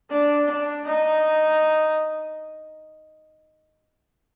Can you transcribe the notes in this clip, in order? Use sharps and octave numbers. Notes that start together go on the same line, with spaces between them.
D4
D4
D#4